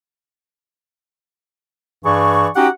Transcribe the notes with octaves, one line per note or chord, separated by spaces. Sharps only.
G2 E3 G#4 D5 C#6
C#4 D#4 F#4 G4 F#5 G5